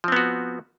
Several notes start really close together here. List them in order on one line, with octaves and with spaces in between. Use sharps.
F3 C4 B3 F#4